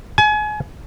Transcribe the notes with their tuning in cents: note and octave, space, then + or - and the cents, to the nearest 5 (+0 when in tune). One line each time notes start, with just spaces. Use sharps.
G#5 +30